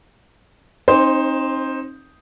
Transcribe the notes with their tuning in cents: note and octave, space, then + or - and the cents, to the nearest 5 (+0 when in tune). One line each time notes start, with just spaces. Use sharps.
C4 +40 D#4 +0 C5 +0